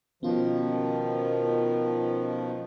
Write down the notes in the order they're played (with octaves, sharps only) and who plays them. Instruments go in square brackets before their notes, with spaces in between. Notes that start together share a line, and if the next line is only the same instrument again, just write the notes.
[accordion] B2 D#3 F3 [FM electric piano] B3 C#4 F4